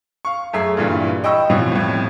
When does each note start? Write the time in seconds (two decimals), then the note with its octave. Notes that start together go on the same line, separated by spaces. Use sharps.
0.25 F5 C#6
0.53 F#2 A3 G#4 E5 C7
0.77 G2 A#2 E3 G3
1.24 D#5 G5 B5 C#6 E6
1.50 B2 E3 F3 G3 C4 C#4
1.72 F2 A2